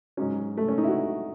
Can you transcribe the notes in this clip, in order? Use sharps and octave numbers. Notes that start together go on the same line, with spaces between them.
G#2 F#3 C#4
A3
C#4
D#4
E4
F#4